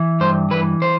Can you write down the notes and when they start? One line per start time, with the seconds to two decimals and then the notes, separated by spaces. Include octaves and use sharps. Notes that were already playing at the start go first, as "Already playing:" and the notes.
Already playing: E3
0.20 G2 C5
0.51 E3 B4
0.82 C5